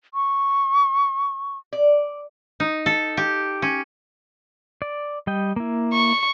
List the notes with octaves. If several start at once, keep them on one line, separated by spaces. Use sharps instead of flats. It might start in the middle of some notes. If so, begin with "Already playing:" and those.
C#6
D5
D#4
A4
G4
C#4
D5
G3 D#5 G5
A#3 E4
C#6